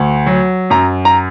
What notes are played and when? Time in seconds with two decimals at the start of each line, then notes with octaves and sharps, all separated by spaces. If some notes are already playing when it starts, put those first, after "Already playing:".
Already playing: D2
0.26 F#3
0.70 F#2 A#5
1.05 A#5